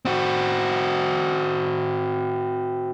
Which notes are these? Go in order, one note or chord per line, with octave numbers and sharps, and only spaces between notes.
C4 F#4